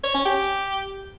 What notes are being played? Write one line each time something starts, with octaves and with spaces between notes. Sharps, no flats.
C#5
C#4
G4